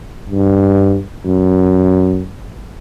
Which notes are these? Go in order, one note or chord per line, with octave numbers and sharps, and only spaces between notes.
G2
F#2